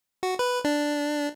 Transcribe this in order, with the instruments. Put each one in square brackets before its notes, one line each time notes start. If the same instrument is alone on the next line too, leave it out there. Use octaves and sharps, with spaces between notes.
[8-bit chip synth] F#4
B4
D4